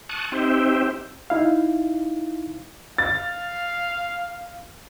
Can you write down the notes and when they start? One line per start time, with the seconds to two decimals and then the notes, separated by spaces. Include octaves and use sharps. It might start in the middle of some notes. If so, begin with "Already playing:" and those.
0.09 A5 C#6 D#6 F#6
0.32 C4 D#4 G4 C5 E5 G5
1.30 D#4 E4 F5
2.98 F5 A6